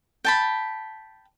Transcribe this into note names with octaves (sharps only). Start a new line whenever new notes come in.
G5 A5 B5